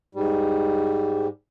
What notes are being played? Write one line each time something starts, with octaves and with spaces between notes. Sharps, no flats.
G#2 G3